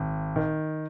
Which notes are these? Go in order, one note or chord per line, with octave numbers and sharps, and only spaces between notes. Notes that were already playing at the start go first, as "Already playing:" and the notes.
Already playing: G#1
D#3